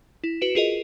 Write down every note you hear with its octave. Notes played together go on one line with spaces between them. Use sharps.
E4
F#4 B4 D7 E7
F4 G#4 A#4 D#5